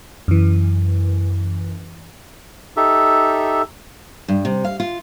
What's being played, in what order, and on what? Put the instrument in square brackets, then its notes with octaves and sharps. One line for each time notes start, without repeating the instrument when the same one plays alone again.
[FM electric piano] F#2 E3
[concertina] D#4 G4 A4 E5
[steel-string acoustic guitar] G2
C3
F5
F4